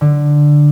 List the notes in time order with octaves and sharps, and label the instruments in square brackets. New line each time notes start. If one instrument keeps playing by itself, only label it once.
[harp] D3